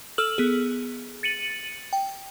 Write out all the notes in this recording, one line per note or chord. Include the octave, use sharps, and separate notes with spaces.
A4 E6 F6 F#7
B3 G#4
A6 C#7 D#7 F#7
G5